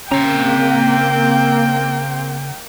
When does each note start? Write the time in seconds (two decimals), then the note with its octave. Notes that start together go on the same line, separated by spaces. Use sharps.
0.11 C#3 A#3 C4 G5 A#5